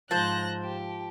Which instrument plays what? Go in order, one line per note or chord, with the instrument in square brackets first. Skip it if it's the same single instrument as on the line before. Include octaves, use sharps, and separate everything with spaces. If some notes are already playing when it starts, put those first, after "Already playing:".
[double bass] G#2 [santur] F3 [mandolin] C5 A5 [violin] F#6 A#6
[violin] G4